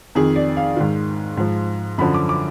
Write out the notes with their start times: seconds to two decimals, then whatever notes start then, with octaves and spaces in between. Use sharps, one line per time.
0.15 F2 D#3 G#4
0.36 D5
0.57 F5
0.77 G#2 D#3
1.37 G#2 F3
1.98 F#2 D3 F3 B5
2.14 D6
2.29 D6